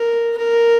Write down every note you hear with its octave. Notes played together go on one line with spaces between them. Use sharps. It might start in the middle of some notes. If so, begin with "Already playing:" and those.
Already playing: A#4
A#4